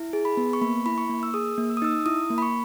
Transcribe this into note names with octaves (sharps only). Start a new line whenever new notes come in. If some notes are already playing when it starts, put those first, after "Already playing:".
Already playing: E4
G#4
B5
B3
C#6
A#3 B5
E4 B5
C#6
A#3
E6
G#4 D#6
A#3
E6
D#6
D#4 E6
E4 D#6
A#3
B5
C#6